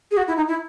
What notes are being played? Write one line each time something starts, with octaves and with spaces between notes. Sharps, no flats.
G#4
F#4
E4
D#4
E4